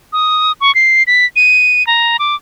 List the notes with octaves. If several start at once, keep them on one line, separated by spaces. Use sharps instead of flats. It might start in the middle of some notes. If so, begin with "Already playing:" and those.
D#6
C#6
C7
B6
D#7
A#5
D6